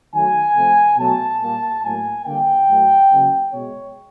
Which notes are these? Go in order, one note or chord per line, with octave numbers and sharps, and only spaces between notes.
D#3 F#3 A3 G#5
C3 F3 A3
B2 F#3 A3 A5
A#2 G3 A#3
A2 F#3 A#3 G#5
D3 G3 A#3 G5
A2 F#3 A3
C#3 F#3 A#3
B2 G#3 C#5